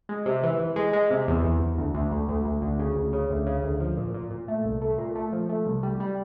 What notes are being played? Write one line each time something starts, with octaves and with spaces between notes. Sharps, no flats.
G#3
C3
E3
E3
G#3
G#3
C3
E2
E2
E2
D2
D2
D2
D2
D2
D2
C#3
D2
C#3
D2
C#3
D2
F3
A#2
A#2
A#2
A3
C2
A3
A#2
A3
F3
A3
C2
G3
G3